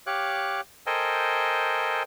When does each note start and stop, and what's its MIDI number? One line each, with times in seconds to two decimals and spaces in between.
0.07 0.61 67
0.07 0.61 73
0.07 0.61 77
0.07 0.61 86
0.07 0.61 90
0.86 2.03 69
0.86 2.03 70
0.86 2.03 72
0.86 2.03 75
0.86 2.03 79
0.86 2.03 80